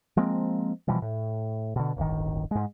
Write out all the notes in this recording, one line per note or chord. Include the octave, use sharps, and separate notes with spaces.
F3 G#3 A#3 C4
B2 E3 F3 G3
A2
B2 D3
D1 G1 D#3
G#2 G#3